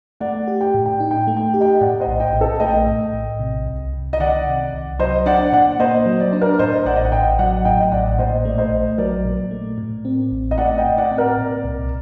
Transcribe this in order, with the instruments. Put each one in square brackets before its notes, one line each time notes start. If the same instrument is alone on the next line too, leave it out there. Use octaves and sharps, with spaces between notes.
[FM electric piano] A3 [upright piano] D5 F#5
[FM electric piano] G4
[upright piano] G5
[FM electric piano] A2
[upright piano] G5
[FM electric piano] D#4
[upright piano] G5
[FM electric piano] A3
[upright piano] G5
[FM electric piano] G4
[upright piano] D#5 G5
[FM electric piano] A2 [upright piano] D5 F#5
[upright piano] C5 D#5
[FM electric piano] A#1
[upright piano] D#5 G5
[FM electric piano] A#1
[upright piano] A4
[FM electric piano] A3 [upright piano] D#5 G5
[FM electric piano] A2
A#1
C3
C2
C2
[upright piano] D#5
[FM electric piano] D#3 [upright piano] D5 F#5
[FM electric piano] C3
C2
[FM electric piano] F#3 [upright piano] C5 D#5
[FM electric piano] D4 [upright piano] D5 F#5
[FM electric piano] A#2 [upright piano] D5 F#5
[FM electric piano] A#3 [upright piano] C5 D#5
[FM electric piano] F#3
[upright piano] D5
[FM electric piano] D4 [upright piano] C5
[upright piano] A#4 D5
[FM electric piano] A2 [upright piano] C5 D#5
[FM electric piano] A1 [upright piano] D5 F#5
[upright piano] D#5
F#5
[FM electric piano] A1 [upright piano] D#5 G5
[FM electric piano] F#3 [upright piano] D5 F#5
[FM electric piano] A2 [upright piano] D#5 G5
[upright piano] D#5
[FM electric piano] A1 [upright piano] D5 F#5
[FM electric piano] A#2 [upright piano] C5 D#5
[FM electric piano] A3 [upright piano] D5
[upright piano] C5 D#5
[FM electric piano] A#1
[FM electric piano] F#3 [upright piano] A#4 D5
[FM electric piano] A#2
A3
A2
C4
A1
[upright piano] D#5
[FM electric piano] A3 [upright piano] D5 F#5
[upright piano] D#5 G5
[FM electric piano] A2
[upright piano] D5 F#5
[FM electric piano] C4
[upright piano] A#4 D5
[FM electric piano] A#2
C2